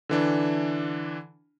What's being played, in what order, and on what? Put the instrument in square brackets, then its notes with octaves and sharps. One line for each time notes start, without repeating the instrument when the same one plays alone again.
[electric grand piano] D3 E3 D4